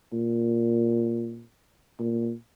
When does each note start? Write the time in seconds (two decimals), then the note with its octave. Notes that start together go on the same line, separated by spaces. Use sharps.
0.13 A#2
1.99 A#2